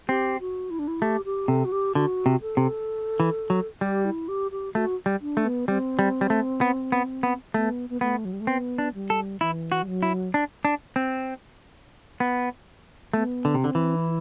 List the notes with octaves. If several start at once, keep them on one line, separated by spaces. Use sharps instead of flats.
C4 G4
F#4
E4
D4
E4
A3 G4
G4
C3 A4
F#4
G4
D3 F#4
C3
A4
C3
E3
F#3
G3 G4
E4
G4
G4
A3 F#4
G3
D4
A3
B3
G3 C4
G3
G3
A3
B3
B3
B3
A3 B3
B3
A3 B3
F#3
G3
A3
B3 C4
D4
G3
A4
E3 E4
F#4
G3
F#3
E4
D4
D4
C4
B3
A3 B3
D3
C3
D3 C4
E3
E4